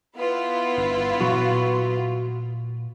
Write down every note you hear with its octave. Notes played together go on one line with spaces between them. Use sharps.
B3 E4 F4
G1 D3 D4
A#2 F#3